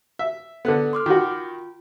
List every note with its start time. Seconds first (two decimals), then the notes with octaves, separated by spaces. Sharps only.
0.19 E5
0.65 D3 B3 A4 F#6
0.93 C6 D6 F6
1.06 D#3 F4 F#4